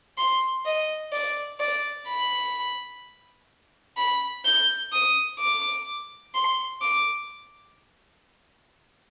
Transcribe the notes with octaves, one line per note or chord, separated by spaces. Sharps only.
C6
D#5
D5
D5
B5
B5
G6
D#6
D6
C6
D6